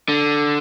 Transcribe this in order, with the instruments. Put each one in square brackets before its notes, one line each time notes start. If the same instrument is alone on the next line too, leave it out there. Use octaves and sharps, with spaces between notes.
[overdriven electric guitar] D3